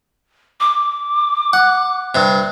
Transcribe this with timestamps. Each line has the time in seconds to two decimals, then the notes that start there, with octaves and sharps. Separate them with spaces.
0.60 D6
1.53 F#5
2.15 G2 C3